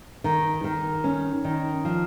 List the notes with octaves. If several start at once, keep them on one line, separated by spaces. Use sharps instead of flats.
D#3
D#3
C#4
D#3
F3